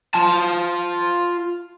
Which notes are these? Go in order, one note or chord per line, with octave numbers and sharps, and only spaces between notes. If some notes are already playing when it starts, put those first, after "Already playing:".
F4 A5